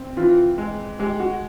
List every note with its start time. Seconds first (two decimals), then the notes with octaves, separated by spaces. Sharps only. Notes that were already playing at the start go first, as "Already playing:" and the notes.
Already playing: C4
0.17 E3 F4
0.58 G#3
0.99 G#3 G4
1.19 F#4